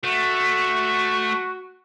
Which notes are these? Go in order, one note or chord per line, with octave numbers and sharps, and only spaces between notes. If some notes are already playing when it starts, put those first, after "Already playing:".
A3 F#4